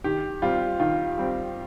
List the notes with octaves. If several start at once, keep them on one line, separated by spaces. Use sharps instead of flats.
D#3 G4
G3 C4 F4 G4
D#3 F4
G3 C4 G4